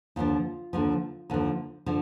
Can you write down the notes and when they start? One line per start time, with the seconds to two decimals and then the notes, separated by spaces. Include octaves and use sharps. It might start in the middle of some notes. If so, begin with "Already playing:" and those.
0.16 D#2 D3 F3 F4
0.73 D#2 D3 F3
1.30 D#2 D3 F3
1.86 D3 F3